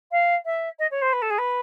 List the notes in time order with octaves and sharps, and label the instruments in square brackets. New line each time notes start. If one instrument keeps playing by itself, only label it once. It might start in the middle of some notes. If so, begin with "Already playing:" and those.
[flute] F5
E5
D#5
C#5
C5
B4
A4
G#4
B4